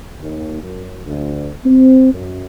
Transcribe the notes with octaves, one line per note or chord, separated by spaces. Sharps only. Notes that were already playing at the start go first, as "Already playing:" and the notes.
D#2
F#2
D2
C4
F#2